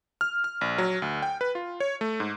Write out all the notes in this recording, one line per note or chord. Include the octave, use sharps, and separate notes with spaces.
F6
F6
A#1
F#3
D2
G5
B4
F4
C#5
A3
G#2